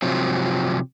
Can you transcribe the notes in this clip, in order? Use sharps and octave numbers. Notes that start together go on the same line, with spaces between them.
C3 F3 F#3 C4